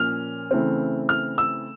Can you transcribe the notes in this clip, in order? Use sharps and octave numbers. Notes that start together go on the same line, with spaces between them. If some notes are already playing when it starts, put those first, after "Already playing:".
Already playing: A#2 F3 A#3 C#4 F6
C#3 E3 A3 C4
F6
E6